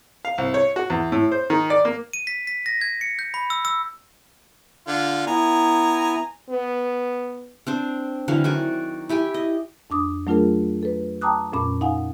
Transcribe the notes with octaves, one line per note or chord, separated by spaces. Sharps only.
F5
C2
C#5
F#4
E2
A2
C5
D#3
D5
A#3
D#7
B6
B6
A#6
G#6
C#7
G6
B5
E6
E6
D3 F4
B3 E4 G#5 A#5
B3
C4 D4 C5
D3 E3 F#3 F5
D#3 F#4 D5 G#5
E4 G4 G5 G#5
D#5
F2 D4 D6 D#6
F#3 A3 D4 F4 G#4 A#4
A4 B4
G5 A5 A#5 D6 D#6 F#6
F2 A#2 C#4 B5 D6
D#4 F5 F#5 G#5